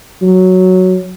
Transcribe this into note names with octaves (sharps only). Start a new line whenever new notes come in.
F#3